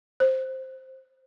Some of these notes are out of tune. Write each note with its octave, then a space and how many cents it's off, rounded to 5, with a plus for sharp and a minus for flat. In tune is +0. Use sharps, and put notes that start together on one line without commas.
C5 +5